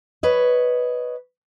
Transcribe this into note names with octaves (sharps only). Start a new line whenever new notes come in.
B4 C#5 D#5